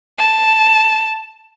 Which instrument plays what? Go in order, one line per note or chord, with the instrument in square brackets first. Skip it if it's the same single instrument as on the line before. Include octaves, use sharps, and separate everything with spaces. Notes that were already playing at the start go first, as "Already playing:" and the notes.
[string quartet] A5